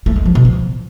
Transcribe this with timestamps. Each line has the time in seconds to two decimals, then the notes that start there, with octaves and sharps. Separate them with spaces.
0.06 A3
0.16 G#3
0.26 F3
0.35 B2
0.45 F3